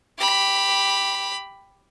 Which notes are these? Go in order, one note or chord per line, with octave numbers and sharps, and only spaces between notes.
G4 B5